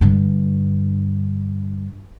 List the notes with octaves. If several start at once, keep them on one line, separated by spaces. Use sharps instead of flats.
G2 D3